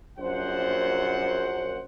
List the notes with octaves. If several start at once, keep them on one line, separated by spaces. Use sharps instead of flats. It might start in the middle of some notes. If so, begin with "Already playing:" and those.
A#1 F#2 C5 F#5